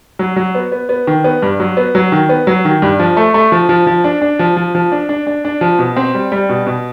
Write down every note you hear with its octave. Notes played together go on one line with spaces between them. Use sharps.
F#3
F#3
B3
B3
B3
D#3
B3
G2
F#3
B3
F#3
D#3
B3
F#3
D#3
G2
F3
A3
A3
F3
F3
F3
D4
D4
F3
F3
F3
D4
D4
D4
D4
F3
B2
C4
G3
G3
B2
B2